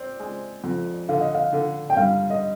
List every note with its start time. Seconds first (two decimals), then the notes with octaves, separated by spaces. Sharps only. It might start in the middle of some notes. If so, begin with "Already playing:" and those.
Already playing: C4 D5
0.20 G#3
0.64 F2
1.09 D3 F5
1.21 D#5
1.35 F5
1.53 D3
1.90 G5
1.97 G2 F5
2.30 D#5